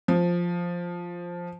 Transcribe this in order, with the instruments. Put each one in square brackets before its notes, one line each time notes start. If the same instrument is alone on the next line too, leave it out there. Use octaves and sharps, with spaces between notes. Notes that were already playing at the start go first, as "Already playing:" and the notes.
[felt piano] F3